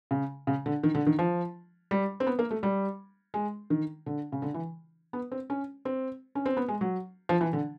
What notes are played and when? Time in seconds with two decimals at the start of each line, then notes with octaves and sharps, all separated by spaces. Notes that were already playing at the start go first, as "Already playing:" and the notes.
0.11 C#3
0.47 C#3
0.66 D3
0.83 D#3
0.95 D3
1.07 D#3
1.19 F3
1.91 G3
2.20 C4
2.27 B3
2.39 A#3
2.51 A3
2.63 G3
3.34 G#3
3.70 D#3
4.06 D3
4.32 C#3
4.42 D3
4.54 E3
5.13 B3
5.32 C4
5.50 C#4
5.85 C4
6.35 C#4
6.46 C4
6.57 B3
6.68 G#3
6.81 F#3
7.29 F3
7.41 E3
7.53 D3